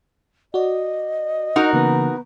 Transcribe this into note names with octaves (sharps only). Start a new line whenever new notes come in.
F#4 D5 D#5
D#4 F#4 A#4
C#3 E3 A#3 B3